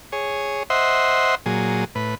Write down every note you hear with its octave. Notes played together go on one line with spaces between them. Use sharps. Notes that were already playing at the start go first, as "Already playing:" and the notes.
G#4 C#5
C5 D#5 E5 F#5 C6
A#2 F#3 G#4
A2 B4